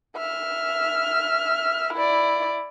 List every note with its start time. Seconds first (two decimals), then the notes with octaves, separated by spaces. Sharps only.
0.17 E5 F6
1.94 E4 D5